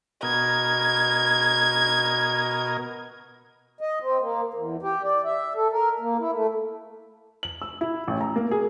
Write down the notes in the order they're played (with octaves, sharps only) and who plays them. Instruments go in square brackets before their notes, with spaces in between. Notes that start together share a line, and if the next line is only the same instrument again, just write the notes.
[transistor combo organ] B2 A#4 D#5 [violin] G#6
[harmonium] D#5
C4
A#3
E2
G4
D5
E5
A4
A#4
A#3
E4
A3
[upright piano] F#7
E6
E4
A1
A#5
A#3
G#4